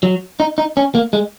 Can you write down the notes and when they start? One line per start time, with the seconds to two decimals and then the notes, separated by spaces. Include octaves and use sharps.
0.03 F#3
0.40 D#4
0.58 D#4
0.77 C#4
0.95 A#3
1.13 G#3